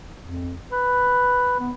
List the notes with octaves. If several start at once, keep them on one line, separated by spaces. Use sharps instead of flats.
F2
B4
B3